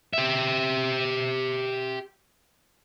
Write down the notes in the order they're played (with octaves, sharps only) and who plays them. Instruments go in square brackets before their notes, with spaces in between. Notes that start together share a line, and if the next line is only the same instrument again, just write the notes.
[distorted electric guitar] G4 E5